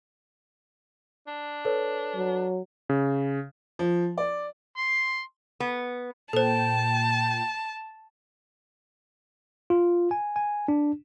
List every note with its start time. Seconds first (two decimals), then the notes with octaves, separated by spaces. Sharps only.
1.27 D4
1.65 A4 B4 C#5
2.15 F#3
2.89 C#3
3.79 F3
4.18 D5
4.78 C6
5.60 B3
6.33 A#2 A4 C5 G5 A5
9.70 F4
10.11 G#5
10.36 G#5
10.68 D4